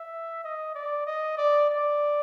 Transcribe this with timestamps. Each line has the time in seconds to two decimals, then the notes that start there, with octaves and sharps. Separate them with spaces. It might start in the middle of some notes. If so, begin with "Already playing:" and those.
Already playing: E5
0.44 D#5
0.75 D5
1.07 D#5
1.38 D5
1.70 D5